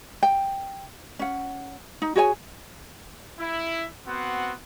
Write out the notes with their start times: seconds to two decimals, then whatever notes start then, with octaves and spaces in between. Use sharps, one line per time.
0.23 G5
1.19 C#4 F#5
2.02 D#4
2.16 F#4 G#4 C#5 G#5
3.40 E4
4.07 B3 C4 F#4 C5 F#5